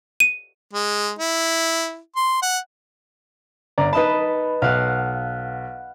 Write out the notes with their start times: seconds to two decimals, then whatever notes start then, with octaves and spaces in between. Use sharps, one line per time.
0.20 D#7
0.74 G#3
1.19 E4
2.16 C6
2.42 F#5
3.78 G1 D5 A#5
3.93 D#4 B4 D#5 A5 B5
4.62 B1 F5 F#5